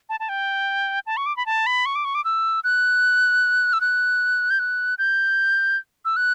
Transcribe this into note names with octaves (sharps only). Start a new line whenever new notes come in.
A5
A5
G5
A5
C#6
D6
B5
A5
B5
C#6
D6
C#6
D6
E6
F#6
E6
F#6
G6
F#6
G6
E6
F#6